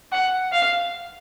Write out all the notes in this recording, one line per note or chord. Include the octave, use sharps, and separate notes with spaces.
F#5
F5